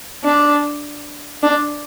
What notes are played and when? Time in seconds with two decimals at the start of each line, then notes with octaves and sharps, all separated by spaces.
0.24 D4
1.43 D4